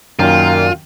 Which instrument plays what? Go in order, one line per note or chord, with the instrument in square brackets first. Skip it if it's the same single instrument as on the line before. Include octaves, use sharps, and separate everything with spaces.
[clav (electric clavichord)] F#2 [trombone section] A#2 [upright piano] D#3 [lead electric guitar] F4